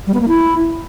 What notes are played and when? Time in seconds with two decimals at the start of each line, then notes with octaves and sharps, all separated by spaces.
0.07 G3
0.14 B3
0.21 A#3
0.28 E4